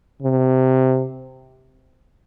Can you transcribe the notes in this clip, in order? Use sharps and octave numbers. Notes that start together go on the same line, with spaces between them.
C3